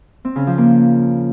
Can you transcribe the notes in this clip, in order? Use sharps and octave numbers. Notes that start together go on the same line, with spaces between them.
C4
C#3
F3
A#3